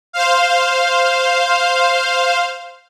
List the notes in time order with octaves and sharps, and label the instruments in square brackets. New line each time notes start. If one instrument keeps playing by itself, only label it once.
[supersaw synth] C5 F5